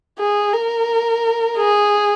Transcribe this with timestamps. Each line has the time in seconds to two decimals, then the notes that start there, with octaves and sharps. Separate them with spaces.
0.19 G#4
0.53 A#4
1.57 G#4